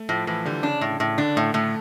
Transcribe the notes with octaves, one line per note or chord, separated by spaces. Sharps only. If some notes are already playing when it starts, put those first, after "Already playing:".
Already playing: A3
A2 F3
A2 E3
D3 G3
C#3 D4
A2
A2
D3 D4
A2 A3
A2 A3